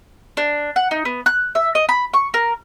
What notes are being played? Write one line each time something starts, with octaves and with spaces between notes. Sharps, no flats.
D4
F#5
D#4
B3
F#6
E5
D#5
B5
C#6
A#4